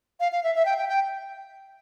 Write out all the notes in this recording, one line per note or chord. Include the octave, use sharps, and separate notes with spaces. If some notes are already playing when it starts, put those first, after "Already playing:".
F5
F5
E5
E5
G5
G5
G5